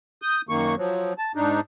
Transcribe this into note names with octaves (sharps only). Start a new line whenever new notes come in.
D#6 G6
F#2 D#3 A#3 C#6
F3 F#3
A5
G#2 D4 D#4